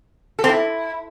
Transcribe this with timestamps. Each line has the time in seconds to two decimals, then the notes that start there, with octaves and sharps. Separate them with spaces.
0.39 A4
0.44 C4
0.49 E4